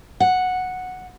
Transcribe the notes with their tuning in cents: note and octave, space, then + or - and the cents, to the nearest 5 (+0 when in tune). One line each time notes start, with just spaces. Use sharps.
F#5 -5